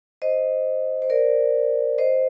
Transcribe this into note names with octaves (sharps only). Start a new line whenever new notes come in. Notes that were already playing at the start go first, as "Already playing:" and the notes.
C5 D#5
C5
A#4 D5
C5 D#5